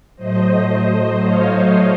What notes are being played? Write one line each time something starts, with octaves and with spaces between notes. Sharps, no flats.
A2 F#3 A3 C5 D#5
C#5 F5